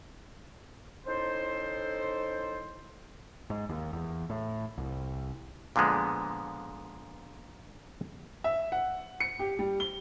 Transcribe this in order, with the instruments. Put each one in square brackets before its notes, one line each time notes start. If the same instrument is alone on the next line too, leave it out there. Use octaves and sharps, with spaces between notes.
[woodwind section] C#4 D#4 E4 A4 C5
[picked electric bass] G#2
D#2
E2
A2
C2
[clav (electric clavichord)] A#2 D3 F3 G#3 B3
[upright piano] E5
F#5
C#7
G4
G3
G7